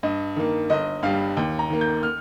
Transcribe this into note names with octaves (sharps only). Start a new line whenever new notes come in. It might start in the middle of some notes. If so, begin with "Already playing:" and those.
G2 D#5
D#3 A#3
G1 D#5
G2 G3 F5
D#2 G5
A#5
D#3 A#3
G6
F6